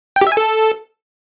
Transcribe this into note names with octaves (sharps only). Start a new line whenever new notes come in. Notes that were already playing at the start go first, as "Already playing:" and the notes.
G5
G4
E5
G#5
A4